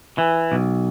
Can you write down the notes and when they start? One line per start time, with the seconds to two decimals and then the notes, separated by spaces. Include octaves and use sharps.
0.18 E3
0.52 B1